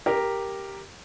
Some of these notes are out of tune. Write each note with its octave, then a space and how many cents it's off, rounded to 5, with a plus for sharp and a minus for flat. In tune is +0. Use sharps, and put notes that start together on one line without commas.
G4 +0 A#4 +0